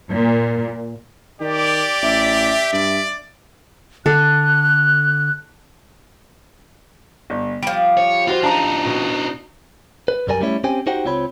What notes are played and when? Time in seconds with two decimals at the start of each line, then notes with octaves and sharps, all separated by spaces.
0.11 A#2
1.41 D#3 G4 D5
2.03 A1 E5
2.73 G2 D5
4.06 D3 A4 F#6
7.30 G1
7.63 F3 G3 D7
7.97 C#5
8.28 F4 F#4 C5
8.43 D4 D#4 A5 A#5
8.85 B2
10.08 B4
10.27 B1 F#2 G3 A#4 D5 G#5
10.41 G3 A3 C#4 E4 C#5
10.64 C4 C#4 G4 C5 G5 G#5
10.87 D#4 F#4 G4 C5 F#5 G5
11.05 C#2 C4 F4 C#5 B5